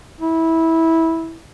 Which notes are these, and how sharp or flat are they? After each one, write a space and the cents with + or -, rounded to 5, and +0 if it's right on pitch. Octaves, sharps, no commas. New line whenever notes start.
E4 -15